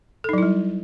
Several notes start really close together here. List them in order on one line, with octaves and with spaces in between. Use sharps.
A4 D#4 F#3 E4 G3